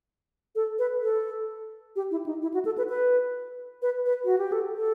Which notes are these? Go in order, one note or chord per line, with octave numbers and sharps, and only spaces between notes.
A4
B4
A4
G4
E4
D#4
E4
F#4
A4
B4
B4
B4
B4
F#4
G4
A4
A4